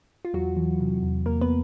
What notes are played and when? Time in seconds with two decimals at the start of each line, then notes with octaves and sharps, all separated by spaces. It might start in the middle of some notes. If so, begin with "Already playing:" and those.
0.25 F4
0.33 E2 F#3 F#4
0.57 E3
0.80 C3
1.03 E2
1.26 E2 A#3 A#4
1.41 B3 B4